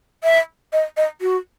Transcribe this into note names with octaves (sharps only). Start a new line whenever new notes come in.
E5
D#5
D#5
F#4